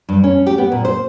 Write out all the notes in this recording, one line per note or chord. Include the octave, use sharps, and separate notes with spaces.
G2
C#4
G4
B3
A#2
C5